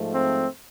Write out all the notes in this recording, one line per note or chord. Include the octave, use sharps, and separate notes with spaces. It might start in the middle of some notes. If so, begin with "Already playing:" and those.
Already playing: G#2 F3 A3
C4